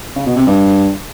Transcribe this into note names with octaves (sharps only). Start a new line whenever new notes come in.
C#3
B2
C3
G2